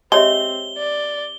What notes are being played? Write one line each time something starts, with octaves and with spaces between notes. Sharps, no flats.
G#3 C4 G4 C#5 E5 G7
D5